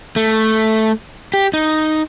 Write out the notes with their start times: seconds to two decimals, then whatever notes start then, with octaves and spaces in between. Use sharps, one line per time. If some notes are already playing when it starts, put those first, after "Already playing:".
0.16 A3
1.34 G4
1.53 D#4